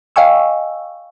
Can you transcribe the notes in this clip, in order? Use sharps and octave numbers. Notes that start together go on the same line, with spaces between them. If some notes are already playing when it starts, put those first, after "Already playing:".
D#5 F5 G5 G#5 C#6 E6